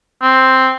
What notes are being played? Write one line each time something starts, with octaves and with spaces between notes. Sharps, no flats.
C4